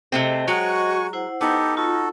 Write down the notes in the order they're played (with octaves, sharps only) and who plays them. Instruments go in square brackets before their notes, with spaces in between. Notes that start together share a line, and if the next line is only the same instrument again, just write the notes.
[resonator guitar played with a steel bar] C3 A3 C4 [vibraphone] G#4 C5 D#5
[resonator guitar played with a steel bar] F#3 G#3 [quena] F#4 [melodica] G#5 C#6
[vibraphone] E4 C5 F#5
[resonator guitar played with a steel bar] B3 [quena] D#4 [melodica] G4 A4
[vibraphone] F4 [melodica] F#4 A4